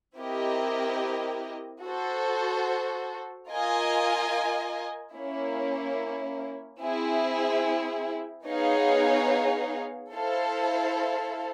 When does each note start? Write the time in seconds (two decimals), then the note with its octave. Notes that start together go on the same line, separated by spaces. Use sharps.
0.17 C4 E4 G4 A#4 D#5
1.83 F#4 A4 C5
3.48 F4 A#4 D#5 G#5
5.14 A#3 C#4 E4
6.80 C4 E4 G#4
8.46 B3 D#4 G#4 C#5 F5
10.12 E4 A4 C5 F5 A5